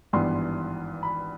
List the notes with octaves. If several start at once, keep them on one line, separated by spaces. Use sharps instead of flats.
G#1 G2 E3 G3 B3 C6
B5